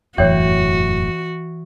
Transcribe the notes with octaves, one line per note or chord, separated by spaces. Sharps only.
E1 F#2 A2 E3 F#4 C#5 G5